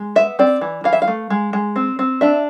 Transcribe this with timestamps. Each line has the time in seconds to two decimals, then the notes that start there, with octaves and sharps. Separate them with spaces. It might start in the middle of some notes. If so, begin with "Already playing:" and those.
Already playing: G#3
0.16 B3 E5
0.39 C4 D5
0.61 E3
0.84 E3 F5
0.93 E5
1.02 F5
1.08 A3
1.30 G#3
1.53 G#3
1.76 C4
1.99 C4
2.21 D4 E5